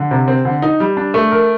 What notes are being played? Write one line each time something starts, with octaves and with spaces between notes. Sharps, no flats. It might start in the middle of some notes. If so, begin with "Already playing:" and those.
Already playing: D3
C3
C4
D3
D#4
G3
D4
A3
A#4